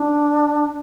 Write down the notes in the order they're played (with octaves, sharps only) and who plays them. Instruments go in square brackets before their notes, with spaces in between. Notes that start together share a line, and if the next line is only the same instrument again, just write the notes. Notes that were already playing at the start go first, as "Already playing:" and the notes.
Already playing: [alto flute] D4